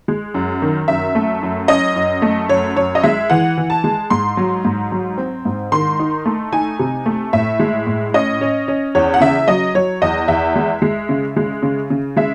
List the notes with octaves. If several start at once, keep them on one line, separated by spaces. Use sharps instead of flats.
G#3
F#2
D#3
F#2 E5
A3
F#2
C#4 D#5
F#2
A3
F#2 C#5
F#2 C#5
D#5
G#3 E5
E3 F#5
E3
A5
G#3
G#2 C6
F#3
G#2
F#3
C4
G#2
D#3 C6
D#4
A3
D#4 G#5
C3
A3
A2 E5
G#3
A2
C#4 D#5
C#4
C#4
E2 C#5
F#5
C#3 E5
F#3 D#5
F#3 C#5
E2 D#5
E2 E5
G#3
G#3
C#3
G#3
C#3
C#3
G#3 E5